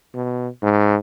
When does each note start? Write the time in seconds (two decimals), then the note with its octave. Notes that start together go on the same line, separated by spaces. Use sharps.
0.14 B2
0.63 G#2